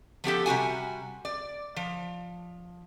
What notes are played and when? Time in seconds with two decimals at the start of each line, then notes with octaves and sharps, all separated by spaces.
0.24 F3 B3 G4 A4
0.46 C3 G3 F#4 G#5
1.25 D5
1.76 F3